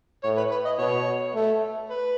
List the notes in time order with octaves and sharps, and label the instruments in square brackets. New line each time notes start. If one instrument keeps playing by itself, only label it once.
[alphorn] A2 [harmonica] C#5
[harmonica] B4
B4
D#5
[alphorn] B2 [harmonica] C#5
[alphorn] A3
[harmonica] B4